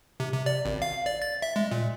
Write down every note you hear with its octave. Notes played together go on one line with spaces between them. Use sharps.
C3
C3
D5
G#1
F5
D5
A6
E5
G#3
A#2